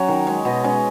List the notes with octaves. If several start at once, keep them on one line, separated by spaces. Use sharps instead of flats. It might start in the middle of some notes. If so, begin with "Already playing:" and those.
Already playing: F#3 C#4 C#5
D#3
G#3 C#4
B2 D#5
G#3 C#4